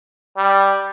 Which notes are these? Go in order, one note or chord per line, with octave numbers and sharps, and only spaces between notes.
G3